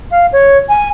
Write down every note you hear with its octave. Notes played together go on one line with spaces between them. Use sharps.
F5
C#5
G#5